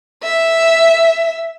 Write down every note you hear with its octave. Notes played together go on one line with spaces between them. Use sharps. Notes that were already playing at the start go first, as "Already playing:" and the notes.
E5